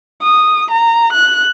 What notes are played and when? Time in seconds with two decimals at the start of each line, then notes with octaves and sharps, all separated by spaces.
0.22 D#6
0.71 A#5
1.12 F#6